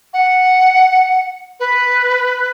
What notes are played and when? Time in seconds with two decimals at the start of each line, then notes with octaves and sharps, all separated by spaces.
0.13 F#5
1.60 B4